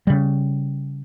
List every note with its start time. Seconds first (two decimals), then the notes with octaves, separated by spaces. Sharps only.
0.07 C#3 G3